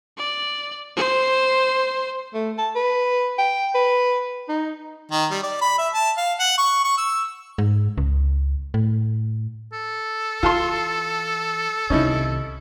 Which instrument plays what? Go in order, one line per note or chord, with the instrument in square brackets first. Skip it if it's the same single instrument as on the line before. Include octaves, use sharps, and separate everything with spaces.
[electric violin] D5
C5
[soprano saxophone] A3
A5
B4
G5
B4
D#4
[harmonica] D#3
G3
D5
B5
E5
A5
F5
F#5
C#6
C#6
E6
[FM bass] G#2
C#2
A2
[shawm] A4
[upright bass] E3 [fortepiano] F4 A5 C6
[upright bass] C2 D#3 [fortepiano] C#4 D#4 E4